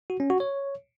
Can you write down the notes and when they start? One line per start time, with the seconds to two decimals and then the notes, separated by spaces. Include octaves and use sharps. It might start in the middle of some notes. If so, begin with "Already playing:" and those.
0.10 F#4
0.20 C#4
0.30 F#4
0.40 C#5